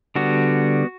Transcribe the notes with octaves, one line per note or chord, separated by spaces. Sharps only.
D3 G3 B3 F#4